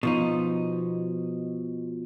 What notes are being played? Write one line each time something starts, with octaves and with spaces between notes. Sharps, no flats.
B2 F3 D#4